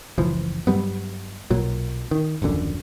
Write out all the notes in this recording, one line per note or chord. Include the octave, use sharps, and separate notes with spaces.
F#1 C#2 E3 F3
G2 F#3 G3 B3
B1 A#2 F#3
D#3
D#1 A#1 F#2 D3